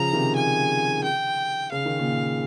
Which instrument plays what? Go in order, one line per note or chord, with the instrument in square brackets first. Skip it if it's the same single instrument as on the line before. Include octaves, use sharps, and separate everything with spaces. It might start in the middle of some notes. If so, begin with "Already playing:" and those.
Already playing: [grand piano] C#3 F3 [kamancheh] A#5
[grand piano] C3 D#3
[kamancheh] G#5
G5
[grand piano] C#3 [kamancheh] F5
[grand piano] D#3
A#2 C#3